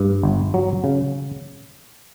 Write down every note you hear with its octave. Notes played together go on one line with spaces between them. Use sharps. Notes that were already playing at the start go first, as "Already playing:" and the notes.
Already playing: G2
G1
F#3
C#3